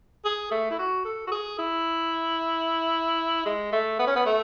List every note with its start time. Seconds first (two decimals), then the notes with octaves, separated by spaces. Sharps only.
0.25 G#4
0.51 A3
0.71 E4
0.79 F#4
1.05 A4
1.27 F#4
1.32 G#4
1.59 E4
3.46 G#3
3.73 A3
3.99 B3
4.07 C#4
4.16 B3
4.26 A3